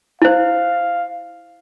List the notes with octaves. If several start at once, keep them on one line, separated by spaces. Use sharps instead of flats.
E4 C5 F5